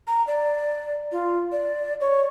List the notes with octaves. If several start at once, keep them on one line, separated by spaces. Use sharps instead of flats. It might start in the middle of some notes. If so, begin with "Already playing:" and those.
A#5
D5
F4
D5
C#5